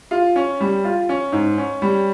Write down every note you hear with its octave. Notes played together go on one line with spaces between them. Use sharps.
F4
C#4
G3
F4
C#4
G#2
C#4
G3